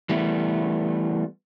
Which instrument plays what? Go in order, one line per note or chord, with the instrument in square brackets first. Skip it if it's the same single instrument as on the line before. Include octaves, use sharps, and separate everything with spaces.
[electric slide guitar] E3 G3 A3 B3